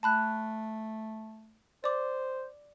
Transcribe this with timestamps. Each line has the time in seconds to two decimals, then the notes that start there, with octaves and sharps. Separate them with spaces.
0.03 A3 A5 B5 F#6
1.84 C5 D5 D6